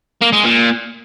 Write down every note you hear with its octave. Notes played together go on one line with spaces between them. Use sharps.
A#3
G#3
A#2